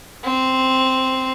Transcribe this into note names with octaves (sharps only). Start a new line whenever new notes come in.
C4